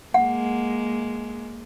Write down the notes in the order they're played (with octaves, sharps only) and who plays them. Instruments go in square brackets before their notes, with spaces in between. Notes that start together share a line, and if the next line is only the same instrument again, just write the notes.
[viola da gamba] G#3 A#3 [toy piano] F#5